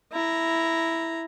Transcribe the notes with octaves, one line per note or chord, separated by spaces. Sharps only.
E4 A#5